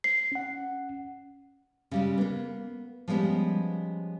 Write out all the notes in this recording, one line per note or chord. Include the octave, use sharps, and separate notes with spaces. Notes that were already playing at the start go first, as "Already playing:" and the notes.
C7
C#4 F#5
C#3 G3 G#3
A#3 B3
F3 G3 G#3 B3 C#4 G4